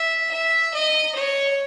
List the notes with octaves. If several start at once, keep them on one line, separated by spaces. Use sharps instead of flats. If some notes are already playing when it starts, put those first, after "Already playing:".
Already playing: E5
E5
D#5
C#5